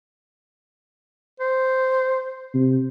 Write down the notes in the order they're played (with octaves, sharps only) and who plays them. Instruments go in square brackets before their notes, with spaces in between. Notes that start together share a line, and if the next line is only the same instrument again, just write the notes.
[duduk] C5
[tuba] C3